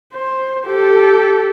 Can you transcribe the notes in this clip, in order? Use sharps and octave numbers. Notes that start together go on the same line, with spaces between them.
C5
G4 A4